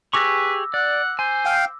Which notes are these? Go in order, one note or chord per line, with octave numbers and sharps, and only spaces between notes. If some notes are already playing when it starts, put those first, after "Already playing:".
G4 G#4 B4 C#6 D6 E6 A#6
D5 F#5
C5 G#5
F5 G5